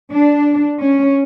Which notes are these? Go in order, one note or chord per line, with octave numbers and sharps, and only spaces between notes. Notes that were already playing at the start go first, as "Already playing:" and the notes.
D4
C#4